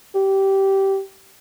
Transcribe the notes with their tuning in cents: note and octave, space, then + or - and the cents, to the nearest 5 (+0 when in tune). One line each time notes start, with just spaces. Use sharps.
G4 -15